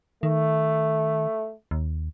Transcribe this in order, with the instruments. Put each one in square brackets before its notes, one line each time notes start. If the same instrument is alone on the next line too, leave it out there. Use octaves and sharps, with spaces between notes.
[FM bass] D#3 [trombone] A3
[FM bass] D#2